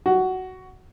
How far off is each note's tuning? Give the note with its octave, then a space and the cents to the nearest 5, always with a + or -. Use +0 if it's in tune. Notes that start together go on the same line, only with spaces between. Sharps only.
F#4 +10